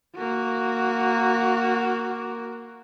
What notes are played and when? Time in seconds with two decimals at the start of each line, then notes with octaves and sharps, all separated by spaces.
0.16 A#3 F#4